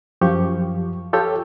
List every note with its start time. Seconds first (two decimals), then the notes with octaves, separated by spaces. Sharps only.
0.21 F#2 F3 G4 C#6
1.13 F4 G4 A4 C#5 G5